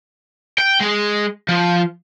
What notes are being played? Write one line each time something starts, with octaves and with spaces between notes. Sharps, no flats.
G5
G#3
F3